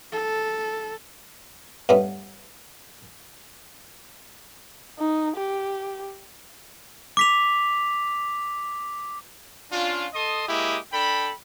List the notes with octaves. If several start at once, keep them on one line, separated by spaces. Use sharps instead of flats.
A4
G2 A3 B3 C#4
D#4
G4
D6 B6 F7
C#4 D4 F4
A4 D#5 C6 D#6
G#3 A#3 E4 G4 D#6
D4 A4 G5 B5